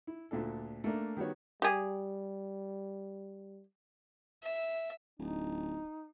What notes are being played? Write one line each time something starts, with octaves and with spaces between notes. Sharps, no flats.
E4
D2 A#2 D4 A4
A3 A#3 D4
D#3 G3 B3 F#4 C#5
G3 G4 G#4
E5
D1 D#4